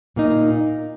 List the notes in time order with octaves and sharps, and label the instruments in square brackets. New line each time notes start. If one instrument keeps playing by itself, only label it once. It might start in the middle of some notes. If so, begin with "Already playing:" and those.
[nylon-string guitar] A#2 A#3 D#4